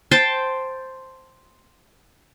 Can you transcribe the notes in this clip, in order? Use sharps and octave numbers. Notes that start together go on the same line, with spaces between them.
C5 G5 A5